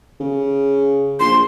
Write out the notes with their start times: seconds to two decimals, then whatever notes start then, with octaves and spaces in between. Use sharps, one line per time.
0.20 C#3
1.20 A#1 C6